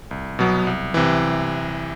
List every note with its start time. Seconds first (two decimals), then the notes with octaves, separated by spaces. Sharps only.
0.11 C2
0.39 B2 F#3 B3
0.67 C2
0.94 C3 E3